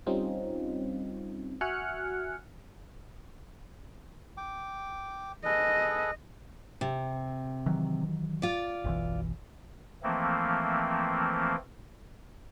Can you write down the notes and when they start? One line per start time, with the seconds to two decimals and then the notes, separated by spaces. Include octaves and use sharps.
0.07 G3 C4 C#4 D#4 F4
1.61 F#4 E5 G#5 F6 F#6 C#7
4.37 G5 D6
5.45 G#4 A4 B4 D#5
6.81 C3
7.66 D#3 E3 F#3
8.42 F4 D5
8.84 F#1 B1 E3
10.03 E3 F3 A3 A#3 C4